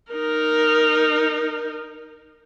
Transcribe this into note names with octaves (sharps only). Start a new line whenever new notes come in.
D#4 A#4